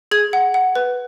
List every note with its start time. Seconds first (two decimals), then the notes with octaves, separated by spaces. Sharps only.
0.11 G#4 G#6
0.33 F#5
0.54 F#5
0.75 B4